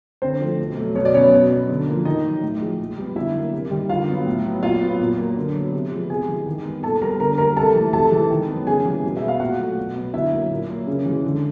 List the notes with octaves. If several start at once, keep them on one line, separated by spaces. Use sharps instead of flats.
D3 C4 C5
F3 A3
B2
F#3 A3
B2 C#5
D5
F#3 B3 C#4 C#5
B2
F#3 B3
D3
F3 A#3
D#3 D#4 D#5
F#3 A#3
A2
F3 G#3
A#2
G3 B3
D3 E4 E5
F#3
A#3
C3
D#3 G3
D3 F4 F5
F#3 B3
A2
F#3 B3
A#2 F4 F5
F#3 B3
A#2
F#3 A#3
D3
F#3 B3
C3
F3 G#3 B3
C3 G#4 G#5
E3 G#3
D#3
G3 B3
A#2 A4 A5
G3 B3 A#4 A#5
D3 A#4 A#5
G3 A#3 A#4 A#5
C3 A4 A5
E3 A3
C3 A4 A5
E3 G#3
D#3
F#3 B3
C#3 G#4 G#5
E3 G3 A#3
B2
E5
G#3 B3
F5
A#2 F#4 F#5
F#3 A3
B2
F#3 B3
D3 E4 E5
F#3 A#3
A#2
F#3 A#3
C#3
E3 G#3
D3